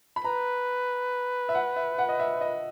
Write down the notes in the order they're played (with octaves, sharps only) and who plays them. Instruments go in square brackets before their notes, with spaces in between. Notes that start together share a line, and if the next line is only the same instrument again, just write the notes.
[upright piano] B5
[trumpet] B4 [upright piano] A#5
[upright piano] E5
F#5
E5
F#5
D#5
E5
D#5